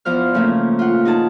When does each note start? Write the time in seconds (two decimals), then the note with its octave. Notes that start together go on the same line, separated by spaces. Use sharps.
0.05 E2 F3 C5 F6
0.34 C#3 F3 A3 A#3
0.79 F4 F#5
1.05 D#4 G#4 A5